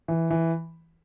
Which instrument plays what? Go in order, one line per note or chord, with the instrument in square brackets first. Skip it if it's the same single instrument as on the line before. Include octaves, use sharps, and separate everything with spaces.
[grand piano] E3
E3